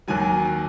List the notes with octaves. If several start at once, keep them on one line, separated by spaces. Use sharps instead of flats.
D#2 D#3 F#3 G#5